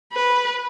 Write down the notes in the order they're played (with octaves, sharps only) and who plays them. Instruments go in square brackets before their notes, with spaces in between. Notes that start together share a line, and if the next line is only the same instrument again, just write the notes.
[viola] B4